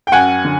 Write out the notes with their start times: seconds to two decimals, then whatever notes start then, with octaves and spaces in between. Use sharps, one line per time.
0.07 G5
0.12 F#2 F#5 G#5
0.45 D3